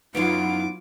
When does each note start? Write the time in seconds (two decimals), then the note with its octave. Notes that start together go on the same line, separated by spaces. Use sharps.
0.15 F#2 E3 F#3 B3 D#4 F4 D6